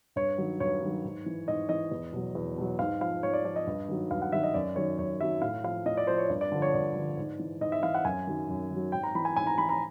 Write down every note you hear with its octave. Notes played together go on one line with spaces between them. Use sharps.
G2 C#5
D#3 F#3
G2 C#5
D#3 F#3
G#2
E3
G#2 D#5
E3 D#5
E2
B2 F#3
E2
B2 F#3
G#2 F5
F3 F5
G#2 C#5
D5
F3 D5
D#5
G2
D#3 F#3
G2 F5
F#5
D#3 F#3 E5
D#5
F#2 D5
D#3 F#3 C#5
F#2 C#5
D#3 F#3 E5
A2 F5
F3 F5
A2 D#5
D5
F3 C5
C#5
G2 D5
D5
D3 F3
C#5
G2 D5
D3 F3
G#2
E3
G#2 D#5
E5
E3 F5
F#5
F#2 G#5
D#3 F#3
F#2
D#3
F#3
G#2 G5
A#5
E3 B5
G#5
G#2 G#5
A#5
E3 B5
A#5